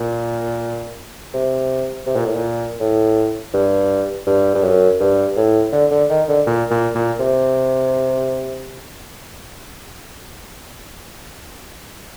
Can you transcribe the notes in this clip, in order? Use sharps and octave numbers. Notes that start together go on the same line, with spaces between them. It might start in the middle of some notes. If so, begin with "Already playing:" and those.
Already playing: A#2
C3
C3
A#2
A2
A#2
A2
G2
G2
G2
F#2
G2
A2
D3
D3
D#3
D3
A#2
A#2
A#2
C3